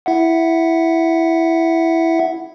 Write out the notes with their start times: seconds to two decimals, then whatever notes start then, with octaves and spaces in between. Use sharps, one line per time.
0.06 E4 E5 F#5